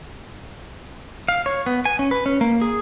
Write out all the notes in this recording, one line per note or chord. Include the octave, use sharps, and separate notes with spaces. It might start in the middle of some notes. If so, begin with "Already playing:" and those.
F5
C#5
B3
G#5
C#4
B4
C#4
A#3
G#4